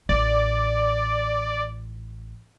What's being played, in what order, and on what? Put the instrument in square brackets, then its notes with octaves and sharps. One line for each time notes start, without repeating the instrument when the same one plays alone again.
[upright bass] A1 [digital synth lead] D5